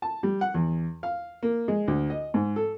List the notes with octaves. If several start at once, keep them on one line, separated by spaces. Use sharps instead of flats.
A5
G3
F#5
E2
F5
A#3
G#3
D2
D#5
G#2
A4